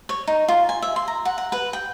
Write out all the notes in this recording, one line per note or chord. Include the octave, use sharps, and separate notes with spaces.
C#5
D#4
F4
G#5
E5
C6
A#5
F#5
F#5
B4
G5